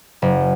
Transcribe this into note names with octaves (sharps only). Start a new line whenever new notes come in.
F#1